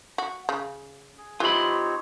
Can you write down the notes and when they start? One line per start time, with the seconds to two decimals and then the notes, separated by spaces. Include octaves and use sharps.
0.18 F#4
0.49 C#3
1.18 G#4
1.40 E3 C4 D#4 F4 G4 C#5 B5